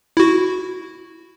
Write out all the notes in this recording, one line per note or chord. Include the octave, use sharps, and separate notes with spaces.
E4 F#4